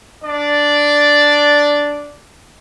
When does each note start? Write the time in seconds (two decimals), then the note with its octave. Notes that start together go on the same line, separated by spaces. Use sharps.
0.24 D4 D5